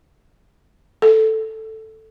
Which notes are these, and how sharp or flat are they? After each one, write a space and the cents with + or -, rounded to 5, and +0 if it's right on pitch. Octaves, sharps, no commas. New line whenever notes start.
A4 +0